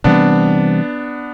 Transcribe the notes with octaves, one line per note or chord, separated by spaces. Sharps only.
C3 E3 G3 B3 C4 D4